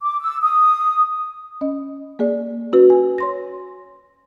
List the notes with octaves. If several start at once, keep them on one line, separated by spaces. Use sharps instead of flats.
D6
E6
D#6
C#4 D#5
A#3 G#4 D5
C#4 F#4 B4
G#5
C#5 C6 A#6